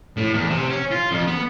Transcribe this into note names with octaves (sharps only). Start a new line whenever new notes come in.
A2
E2
C3
C#4
F4
F2
B3